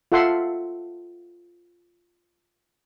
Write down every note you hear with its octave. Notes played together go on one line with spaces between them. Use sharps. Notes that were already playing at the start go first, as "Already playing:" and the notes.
F4 A4 E5 F#5 C6